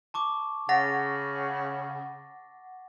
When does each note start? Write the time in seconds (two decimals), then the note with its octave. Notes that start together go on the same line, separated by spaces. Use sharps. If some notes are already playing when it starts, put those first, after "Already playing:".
0.14 A5 C#6 D6
0.69 C#3 F#5 A6 A#6